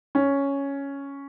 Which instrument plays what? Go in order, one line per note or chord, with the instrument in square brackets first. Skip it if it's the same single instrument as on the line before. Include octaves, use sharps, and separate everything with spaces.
[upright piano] C#4